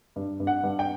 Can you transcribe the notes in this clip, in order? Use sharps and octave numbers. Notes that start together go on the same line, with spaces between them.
G2
G2
F#5
G2
G5